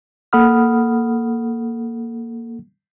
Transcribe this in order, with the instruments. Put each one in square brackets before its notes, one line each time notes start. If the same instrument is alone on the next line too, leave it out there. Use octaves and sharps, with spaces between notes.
[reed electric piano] A#3 A4 F#5 B5 D#6 F6